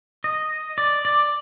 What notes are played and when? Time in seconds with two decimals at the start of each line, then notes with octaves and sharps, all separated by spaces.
0.24 D#5
0.78 D5
1.05 D5